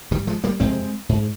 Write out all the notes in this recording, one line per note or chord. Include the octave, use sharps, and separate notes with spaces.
G#2 D#3 G3
F3 G#3
G3 A#3
F2 C3 G#3 C4
G#2